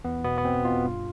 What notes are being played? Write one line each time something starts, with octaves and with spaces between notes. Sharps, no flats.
E2 B3
B2 B3
B3
B2 C4
B2 F4
G2